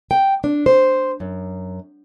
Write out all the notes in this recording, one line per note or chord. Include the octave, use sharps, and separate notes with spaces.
G5
D4
C5
F#2